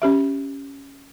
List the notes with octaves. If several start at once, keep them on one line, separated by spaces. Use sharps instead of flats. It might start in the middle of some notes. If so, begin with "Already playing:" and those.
C#4 G4 E5